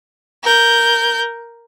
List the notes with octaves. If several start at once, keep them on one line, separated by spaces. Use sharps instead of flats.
A#4 G6